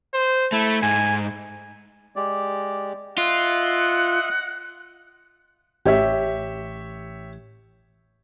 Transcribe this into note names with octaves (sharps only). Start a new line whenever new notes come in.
C5
A3 E4
G#2 G#5
G#3 G4 D5
F4 D#5 E5 F#5 C6
A1 G4 C#5 E5